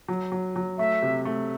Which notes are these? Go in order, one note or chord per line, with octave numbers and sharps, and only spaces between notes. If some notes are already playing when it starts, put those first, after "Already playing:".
F#3
F#3
F#3
A3 E5
C3
A3